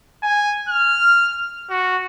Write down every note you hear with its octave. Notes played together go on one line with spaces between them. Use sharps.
G#5
F6
F#4